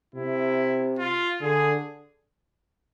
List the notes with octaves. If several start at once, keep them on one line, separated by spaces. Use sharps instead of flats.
C3 E4
F4
D3 G#4